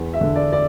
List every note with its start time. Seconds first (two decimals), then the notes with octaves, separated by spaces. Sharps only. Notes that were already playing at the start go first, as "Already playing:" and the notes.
Already playing: E2
0.14 E5
0.21 D3
0.36 D5
0.52 D5